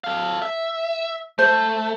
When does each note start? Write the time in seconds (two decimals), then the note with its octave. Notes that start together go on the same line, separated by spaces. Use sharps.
0.04 A4 F5
0.42 E5
1.39 A3 C5